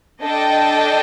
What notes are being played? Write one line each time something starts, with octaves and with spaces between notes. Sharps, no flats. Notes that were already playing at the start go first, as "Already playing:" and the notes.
D4 A4 D#5 G5